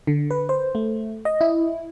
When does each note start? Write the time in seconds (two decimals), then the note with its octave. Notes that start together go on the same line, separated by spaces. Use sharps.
0.07 D3
0.31 B4
0.49 C5
0.75 A3
1.25 D#5
1.41 E4